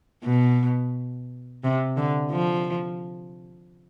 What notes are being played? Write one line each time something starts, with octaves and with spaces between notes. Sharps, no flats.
B2
C3
D3
F3